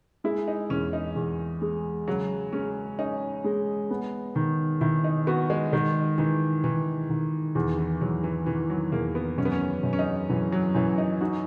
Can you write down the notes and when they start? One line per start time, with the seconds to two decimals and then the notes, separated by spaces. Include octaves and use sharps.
0.24 G#3 E4
0.48 D#4
0.70 E2 C#4
0.93 D#4
1.16 E2
1.61 G#3
2.08 C#3 F#3
2.53 G#3 C#4
2.99 C#4 D#4
3.44 G#3
3.90 B3
4.36 D#3
4.81 D#3 E4
5.04 D#4
5.27 B3 F#4
5.50 G#3
5.73 D#3 G#3
6.18 D#3 E3
6.64 D#3 E3
7.10 D#3
7.55 E2 E3
7.78 E3
8.01 E2 F#3
8.24 E3
8.46 D#3 E3
8.70 F#3
8.92 E2 A#3
9.15 B3
9.38 F#2 C#4
9.45 B3
9.52 C#4
9.83 F#2
9.93 C#4
9.99 D#4
10.30 F#2 E3
10.52 F#3
10.75 F#2 E3
10.98 D#4
11.21 D#4 F#4